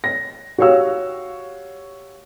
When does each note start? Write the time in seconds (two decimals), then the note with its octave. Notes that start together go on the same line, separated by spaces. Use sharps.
0.04 A#6
0.58 F#4 G4 C#5 F5 E6